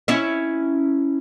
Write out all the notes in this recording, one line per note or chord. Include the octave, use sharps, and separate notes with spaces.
C#4 E4 E5